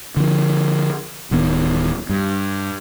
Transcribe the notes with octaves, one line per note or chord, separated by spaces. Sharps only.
D3 F3
D1 D#3 B3
G2